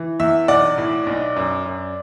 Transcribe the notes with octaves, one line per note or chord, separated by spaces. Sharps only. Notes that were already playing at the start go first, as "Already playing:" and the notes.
Already playing: E3
E2 E5
B1 D5 F#5
A2
B1
F#2
F#2